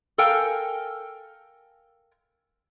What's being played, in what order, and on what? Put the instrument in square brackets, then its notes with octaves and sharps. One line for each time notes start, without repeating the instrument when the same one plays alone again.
[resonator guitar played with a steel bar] A4 A#4 F5 G5 G#5